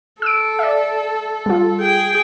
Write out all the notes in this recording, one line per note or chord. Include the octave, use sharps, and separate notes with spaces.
A4 E6 D7
D5 E5
G3 F4
G#4 G5